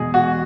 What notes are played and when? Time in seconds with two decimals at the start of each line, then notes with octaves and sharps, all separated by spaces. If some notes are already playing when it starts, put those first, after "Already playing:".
Already playing: E2 B2 G#3 G#4
0.14 F#4